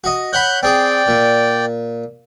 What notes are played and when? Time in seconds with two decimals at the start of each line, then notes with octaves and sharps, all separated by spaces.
0.04 F#4 D#5
0.33 C#5 F#5 B5 F#6 G6
0.63 C4 G#4 D5 G5
1.08 A#2